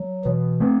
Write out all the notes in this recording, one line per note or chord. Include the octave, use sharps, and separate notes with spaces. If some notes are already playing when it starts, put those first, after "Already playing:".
Already playing: F#3
B2 E3
A3 C4